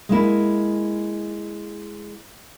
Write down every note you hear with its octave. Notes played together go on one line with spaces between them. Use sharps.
G#3 A#3 E4